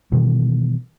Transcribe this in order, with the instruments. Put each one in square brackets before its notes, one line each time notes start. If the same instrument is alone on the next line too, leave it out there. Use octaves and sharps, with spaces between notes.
[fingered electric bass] B2 D#3 E3 G3